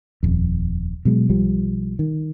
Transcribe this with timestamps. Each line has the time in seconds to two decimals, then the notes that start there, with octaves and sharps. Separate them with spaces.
0.23 D#1 F2
1.05 B2 F#3 G#3
1.29 B1 F3 G3
1.99 D#3